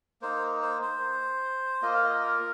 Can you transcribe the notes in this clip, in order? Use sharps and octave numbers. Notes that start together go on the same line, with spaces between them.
A#3 D#4 C5
C5
C5
A#3 F4 D#5
F5
D#5
A#4